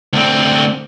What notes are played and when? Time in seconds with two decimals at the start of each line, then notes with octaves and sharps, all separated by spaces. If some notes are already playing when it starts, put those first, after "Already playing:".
0.13 D2 C4